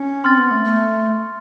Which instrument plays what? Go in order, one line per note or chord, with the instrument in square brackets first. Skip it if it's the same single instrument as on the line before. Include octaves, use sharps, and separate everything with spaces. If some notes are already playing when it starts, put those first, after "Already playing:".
Already playing: [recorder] C#4
[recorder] C4 [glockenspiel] C6 F6 A6
[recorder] B3
A3
A3